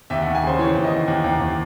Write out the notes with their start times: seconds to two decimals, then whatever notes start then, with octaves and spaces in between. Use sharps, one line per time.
0.10 D#2 E5
0.22 F#5
0.27 D#2
0.35 G#5
0.44 C#3 C5
0.59 E3 C#5
0.75 D#2
0.84 D#5
0.91 D#2
1.08 D#2
1.24 D#2
1.40 D#2